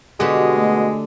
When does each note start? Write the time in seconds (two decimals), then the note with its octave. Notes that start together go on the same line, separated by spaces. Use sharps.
0.20 B2 D3 G#3 F#4 G4
0.56 A3